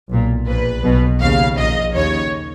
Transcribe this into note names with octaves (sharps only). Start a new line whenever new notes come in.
B1 A#2
A#1 A#2 B4
B1 B2
D#2 C#3 F5
A#1 A#2 D#5
D#2 C#3 C#5